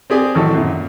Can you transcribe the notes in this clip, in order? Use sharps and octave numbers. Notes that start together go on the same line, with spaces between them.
C4 G4 G#4 D5
A1 D#2 E3 F#3 A4 C#6
F#2 A#2